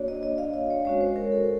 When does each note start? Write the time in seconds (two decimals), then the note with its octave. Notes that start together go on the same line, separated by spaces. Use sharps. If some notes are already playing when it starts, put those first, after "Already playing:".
Already playing: A#3 D4 F#4 C#5 D5
0.08 D#5
0.23 D#5
0.38 F5
0.54 D#5
0.70 C#5
0.85 G#3 C#4 F#4 C#5
1.01 C5
1.16 A#4
1.32 A4